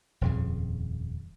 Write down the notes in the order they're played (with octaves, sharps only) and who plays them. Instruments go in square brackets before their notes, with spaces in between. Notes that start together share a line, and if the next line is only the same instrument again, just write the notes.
[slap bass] D#1 F2 C#3